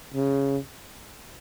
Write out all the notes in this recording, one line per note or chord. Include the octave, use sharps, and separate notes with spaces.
C#3